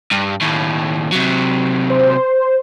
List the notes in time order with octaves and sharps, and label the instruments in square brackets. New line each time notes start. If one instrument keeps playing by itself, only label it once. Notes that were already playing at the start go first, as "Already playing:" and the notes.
[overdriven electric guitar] G2
D#2 A2
C3 F#3
[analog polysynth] C5